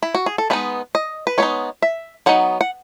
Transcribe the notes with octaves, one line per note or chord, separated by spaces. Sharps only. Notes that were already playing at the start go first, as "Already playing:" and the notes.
E4
F#4
G#4
A4
G#3 B3 D#4 B4
D#5
B4
G#3 B3 D#4 C#5
E5
F#3 B3 D#4 F#5
F#5